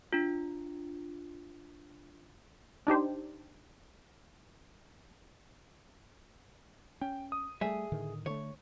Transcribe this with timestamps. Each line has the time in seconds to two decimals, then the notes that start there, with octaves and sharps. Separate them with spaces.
0.13 D4 F4
2.87 D4 D#4 G4 C5
7.01 C#4 G5
7.32 D#6
7.61 G3 A3 G#4 E5
7.92 A2 D3 D#3
8.26 D3 A3 C#5